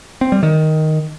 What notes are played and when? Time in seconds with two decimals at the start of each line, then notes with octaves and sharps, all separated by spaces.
0.21 C4
0.32 G3
0.43 D#3